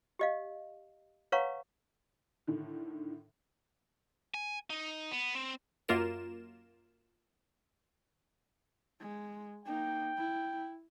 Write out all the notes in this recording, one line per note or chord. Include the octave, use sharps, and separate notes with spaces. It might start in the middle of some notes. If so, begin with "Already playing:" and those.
G4 D#5 F5
B4 C#5 F5 F#5 A#5 C#6
A2 D3 D#3
G#5
D#4
B3
C4
F#2 A#3 F4 A#4 E7
G#3
A#3 D#4 G5
E4